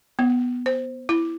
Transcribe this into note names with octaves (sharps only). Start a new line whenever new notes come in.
B3
C5
E4